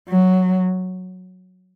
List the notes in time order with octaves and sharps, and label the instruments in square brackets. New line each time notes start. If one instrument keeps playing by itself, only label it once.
[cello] F#3